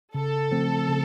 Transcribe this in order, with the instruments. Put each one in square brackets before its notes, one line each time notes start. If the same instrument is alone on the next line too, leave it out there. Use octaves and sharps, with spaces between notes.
[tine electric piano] C#3 [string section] A4
[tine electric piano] F3 A3 C4
C#3